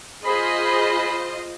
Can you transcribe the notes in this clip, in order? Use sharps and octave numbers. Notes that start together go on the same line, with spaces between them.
F4 G#4 C5 D#5 B5